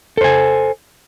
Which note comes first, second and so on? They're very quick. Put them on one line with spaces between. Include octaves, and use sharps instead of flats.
A4 C5 G#5